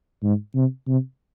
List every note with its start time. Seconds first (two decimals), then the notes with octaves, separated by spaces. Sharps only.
0.23 G#2
0.55 C3
0.87 C3